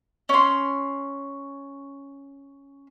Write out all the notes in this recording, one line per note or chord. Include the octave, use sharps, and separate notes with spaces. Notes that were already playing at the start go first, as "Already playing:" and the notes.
C#4 C6